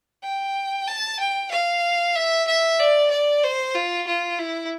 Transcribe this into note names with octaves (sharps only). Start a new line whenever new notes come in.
G5
A5
G5
F5
E5
E5
D5
D5
C5
F4
F4
E4